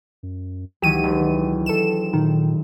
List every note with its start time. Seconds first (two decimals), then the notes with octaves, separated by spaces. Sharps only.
0.23 F#2
0.82 C#2 D#3 E3 F#3 G4 D#7
1.04 E1
1.66 A4 E7
2.13 A#2 D#3